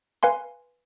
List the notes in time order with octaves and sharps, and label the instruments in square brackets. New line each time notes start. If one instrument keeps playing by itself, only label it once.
[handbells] B4 F5 G#5 C6